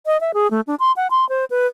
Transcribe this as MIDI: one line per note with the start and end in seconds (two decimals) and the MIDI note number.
0.06 0.20 75
0.21 0.32 76
0.34 0.50 68
0.51 0.61 57
0.67 0.75 62
0.80 0.92 84
0.96 1.07 78
1.11 1.28 84
1.29 1.45 72
1.50 1.67 71